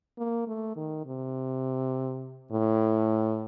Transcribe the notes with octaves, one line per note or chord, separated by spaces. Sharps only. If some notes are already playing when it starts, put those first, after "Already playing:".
A#3
A3
D#3
C3
A2